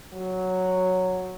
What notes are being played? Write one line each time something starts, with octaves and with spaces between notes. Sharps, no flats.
F#3